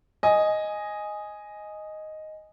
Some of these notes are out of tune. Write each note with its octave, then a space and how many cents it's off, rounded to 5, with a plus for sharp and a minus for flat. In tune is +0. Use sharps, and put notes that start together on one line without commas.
D#5 +0 G#5 +0